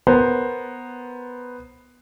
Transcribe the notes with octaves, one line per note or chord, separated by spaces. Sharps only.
B3 A#4 C5